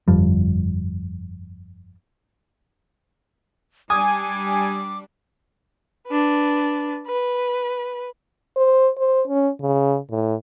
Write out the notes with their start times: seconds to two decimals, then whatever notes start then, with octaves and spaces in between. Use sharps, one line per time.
0.08 G1 F2 F3 G3
3.90 G3 D4 G#5 D6 D#6
6.07 D4 B4
7.07 B4
8.57 C5
8.98 C5
9.28 C#4
9.61 C#3
10.11 A2